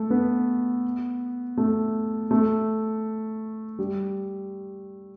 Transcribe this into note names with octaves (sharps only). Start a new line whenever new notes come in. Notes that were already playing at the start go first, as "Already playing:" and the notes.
Already playing: A3
B3
A3
A3
G3